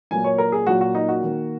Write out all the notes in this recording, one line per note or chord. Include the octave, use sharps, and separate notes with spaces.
A#2 F#3 A#3 G#5
C#5
A#4
G#4
A#2 F#3 A#3 F#4
F#4
D#4
F#4
D#3 A#3